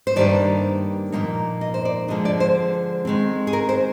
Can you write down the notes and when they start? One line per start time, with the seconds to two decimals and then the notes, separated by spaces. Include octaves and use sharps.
0.07 C5
0.16 G2 D#3 G3 A#3 D4 D5
1.12 A#2 F3 A#3 D#4
1.61 D#5
1.74 C5
1.85 D5
2.08 D3 F3 G#3 D4 D#5
2.25 D5
2.40 C5
3.05 D#3 G#3 C4
3.47 G#4
3.53 A#4
3.69 C5